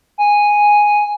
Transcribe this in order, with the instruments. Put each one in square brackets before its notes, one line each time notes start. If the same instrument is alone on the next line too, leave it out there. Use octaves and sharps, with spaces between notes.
[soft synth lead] G#5